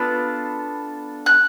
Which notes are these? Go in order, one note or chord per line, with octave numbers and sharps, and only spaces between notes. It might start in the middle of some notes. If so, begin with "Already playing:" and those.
Already playing: B3 D4 F4 A4
F#6